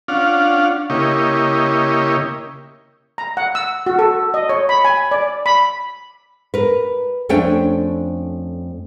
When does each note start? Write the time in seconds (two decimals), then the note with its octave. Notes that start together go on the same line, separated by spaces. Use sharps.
0.08 C#4 D4 F4 F5 F#5
0.90 C#3 A#3 E4 G4 C#5 D#5
3.18 A#5
3.37 F#5
3.55 E6
3.86 F#4
3.99 A4
4.34 D#5
4.49 C#5
4.69 B5
4.85 G#5
5.11 D5
5.46 B5
6.54 A#4 B4
7.29 F2 A3 C#4 D4 G5